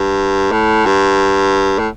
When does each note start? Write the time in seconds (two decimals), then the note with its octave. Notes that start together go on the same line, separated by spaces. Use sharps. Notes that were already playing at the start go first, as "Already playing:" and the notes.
Already playing: G2
0.52 A2
0.86 G2
1.79 A2